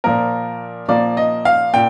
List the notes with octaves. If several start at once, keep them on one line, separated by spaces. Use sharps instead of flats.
A#2 F3 A#3 A#4
A#2 F3 A#3 D5
D#5
F5
A#2 G5